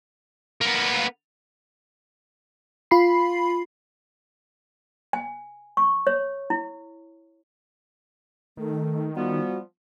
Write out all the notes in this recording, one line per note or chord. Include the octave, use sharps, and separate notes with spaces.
A#3 B3
F4 B5 C7
G#5
C#6
C#5
E4
D#3 A3
F3 G3 B3 F#4